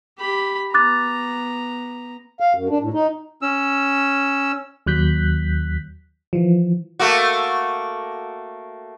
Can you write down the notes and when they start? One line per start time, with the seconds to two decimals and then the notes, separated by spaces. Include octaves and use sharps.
0.19 G4 B5
0.74 B3 A#5 D6 F#6 A6
2.40 F5
2.54 F#2
2.69 D4
2.81 A2
2.94 D#4
3.42 C#4 E6
4.86 D#2 F#3 F#6 G6 B6
6.33 E3 F3
6.99 A3 A#3 F#4